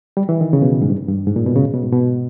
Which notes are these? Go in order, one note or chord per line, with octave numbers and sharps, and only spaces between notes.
G3
E3
D#3
C#3
B2
G#2
G2
G2
G#2
A#2
B2
C#3
B2
G#2
B2